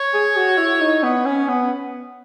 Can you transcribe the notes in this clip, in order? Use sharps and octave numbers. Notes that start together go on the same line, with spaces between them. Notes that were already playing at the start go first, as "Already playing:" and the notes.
Already playing: C#5
G#4
F#4
E4
D#4
B3
C#4
B3